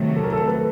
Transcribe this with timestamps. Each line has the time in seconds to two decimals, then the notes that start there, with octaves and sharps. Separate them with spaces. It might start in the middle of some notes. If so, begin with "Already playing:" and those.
Already playing: C3 D#3 F#3 A3
0.16 A4
0.24 A#4
0.33 A4
0.47 B4